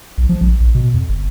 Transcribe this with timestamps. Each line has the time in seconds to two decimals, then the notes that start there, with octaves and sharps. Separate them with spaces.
0.18 B1
0.29 F3
0.41 A#1
0.60 A#1
0.75 B2
0.94 F2
1.09 G1